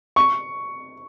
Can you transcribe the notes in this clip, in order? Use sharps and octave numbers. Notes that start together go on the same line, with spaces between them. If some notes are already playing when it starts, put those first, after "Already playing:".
C#6